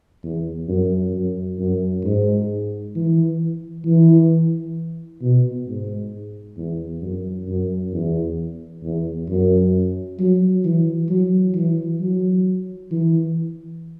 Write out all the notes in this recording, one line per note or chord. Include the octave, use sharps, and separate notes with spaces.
E2
F#2
F#2
F#2
G#2
E3
E3
B2
G#2
E2
F#2
F#2
E2
E2
F#2
F#3
E3
F#3
E3
F#3
E3